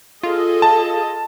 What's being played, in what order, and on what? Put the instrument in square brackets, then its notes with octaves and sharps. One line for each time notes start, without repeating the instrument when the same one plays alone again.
[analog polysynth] F4 [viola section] G#4 A4 D#5
[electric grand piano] A5